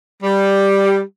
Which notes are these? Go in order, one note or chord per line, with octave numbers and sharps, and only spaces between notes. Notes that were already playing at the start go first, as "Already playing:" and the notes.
G3